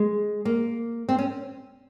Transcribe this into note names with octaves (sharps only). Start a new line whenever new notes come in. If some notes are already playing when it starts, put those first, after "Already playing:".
Already playing: G#3
A#3
C4
C#4